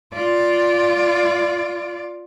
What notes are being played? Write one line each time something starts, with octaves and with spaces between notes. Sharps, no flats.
F4 D5